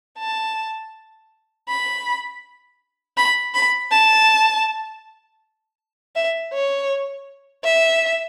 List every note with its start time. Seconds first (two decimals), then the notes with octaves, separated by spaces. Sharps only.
0.19 A5
1.69 B5
3.17 B5
3.54 B5
3.91 A5
6.15 E5
6.53 C#5
7.64 E5